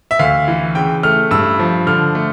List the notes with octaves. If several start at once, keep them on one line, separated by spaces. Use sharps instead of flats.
E5
D2 F5
E3
C#3 G5
A3 F6
G2 E6
F3
D3 F6
A3